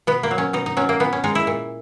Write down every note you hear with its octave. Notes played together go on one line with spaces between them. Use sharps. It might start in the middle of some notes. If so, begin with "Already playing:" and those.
B2 B3
A#3
F#3
C#4
B2 D#4
D#4
F#3 C#4
A#3
A#2 B3
C#4
G#3 D#4
E4
A#2